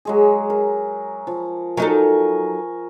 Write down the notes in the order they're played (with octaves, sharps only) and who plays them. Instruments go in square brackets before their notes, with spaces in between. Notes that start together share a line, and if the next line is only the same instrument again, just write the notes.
[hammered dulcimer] F#3 G#3 G#4
A#4
F3
[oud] F#3 D#4 A4 [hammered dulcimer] A#4 G#5 C#6